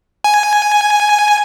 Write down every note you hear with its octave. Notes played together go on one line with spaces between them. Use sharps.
G#5